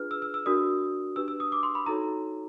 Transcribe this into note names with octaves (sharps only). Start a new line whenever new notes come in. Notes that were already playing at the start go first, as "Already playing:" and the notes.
Already playing: D4 F4 G#4 B4 F6
E6
E6
E6
D4 F#4 A#4 D5 D#6
D4 G4 B4 E6
E6
D#6
D6
C6
B5
D#4 F#4 A4 C#5 A#5